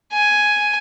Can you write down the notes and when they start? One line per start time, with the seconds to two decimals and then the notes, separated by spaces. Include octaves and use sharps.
0.13 G#5